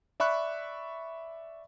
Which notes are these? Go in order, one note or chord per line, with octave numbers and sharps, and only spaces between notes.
D5 E5 B5 C#6 F#6